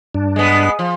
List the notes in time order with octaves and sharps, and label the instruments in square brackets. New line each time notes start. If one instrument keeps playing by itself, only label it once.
[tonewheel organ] G2 D4
[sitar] G#3 B3
F3